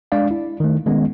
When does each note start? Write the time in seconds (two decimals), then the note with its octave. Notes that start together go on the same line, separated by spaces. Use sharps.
0.12 G#3 D4 D5 F5
0.31 E4
0.60 D#3 A3
0.86 D#3 G#3 B3 C#4